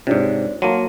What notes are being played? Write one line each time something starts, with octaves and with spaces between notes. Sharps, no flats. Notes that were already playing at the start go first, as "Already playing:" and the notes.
G#2 C3 D4 F4 C#5
F#3 A#3 A5 C6 D#7